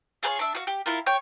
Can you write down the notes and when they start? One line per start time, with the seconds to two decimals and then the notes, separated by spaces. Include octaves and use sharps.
0.23 F4 G#4 B4 C#5
0.39 D4 E5
0.55 F#4 F5
0.67 G4
0.86 E4 F4 A#4
1.06 C#5 G5